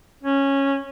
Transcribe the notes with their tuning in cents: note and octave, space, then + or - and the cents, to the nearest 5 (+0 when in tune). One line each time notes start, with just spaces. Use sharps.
C#4 -10